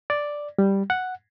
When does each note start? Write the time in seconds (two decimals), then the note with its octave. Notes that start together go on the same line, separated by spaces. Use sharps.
0.10 D5
0.58 G3
0.90 F#5